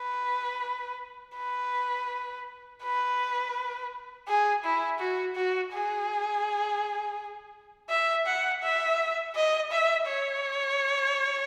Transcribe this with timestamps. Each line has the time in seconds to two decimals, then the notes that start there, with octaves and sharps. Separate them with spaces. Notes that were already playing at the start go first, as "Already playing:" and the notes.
Already playing: B4
1.37 B4
2.83 B4
4.28 G#4
4.64 E4
4.99 F#4
5.35 F#4
5.73 G#4
7.90 E5
8.26 F#5
8.63 E5
9.35 D#5
9.71 E5
10.07 C#5